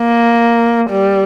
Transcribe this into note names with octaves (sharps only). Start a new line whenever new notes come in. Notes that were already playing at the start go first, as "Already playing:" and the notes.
Already playing: A#3
G3